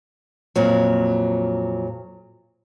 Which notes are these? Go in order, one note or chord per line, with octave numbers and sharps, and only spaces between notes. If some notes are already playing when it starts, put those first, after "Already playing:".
F2 A#2 F#3